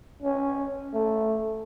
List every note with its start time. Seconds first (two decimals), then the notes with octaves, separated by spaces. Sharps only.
0.22 C#4
0.94 A3